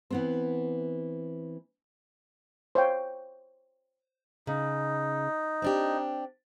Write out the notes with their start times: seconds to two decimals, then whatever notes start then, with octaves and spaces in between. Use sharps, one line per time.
0.10 E3 B3 C4
2.75 C5 C#5 F5 G5
4.47 C#3 D#4
5.62 C4 D4 G4